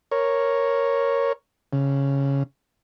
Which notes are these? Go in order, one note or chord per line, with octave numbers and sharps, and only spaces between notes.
A#4 C#5
C#3